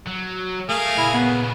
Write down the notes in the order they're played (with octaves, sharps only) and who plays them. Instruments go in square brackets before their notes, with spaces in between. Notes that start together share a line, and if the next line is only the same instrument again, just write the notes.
[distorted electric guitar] F#3
[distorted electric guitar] A3 [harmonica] G#4 A#4 F5
[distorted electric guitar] A#2 C#3 [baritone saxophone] E4
[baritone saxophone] B3